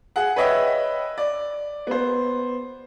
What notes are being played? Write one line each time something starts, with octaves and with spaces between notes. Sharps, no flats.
G#4 F#5
B4 C#5 D#5 E5 G5
D5
B3 C5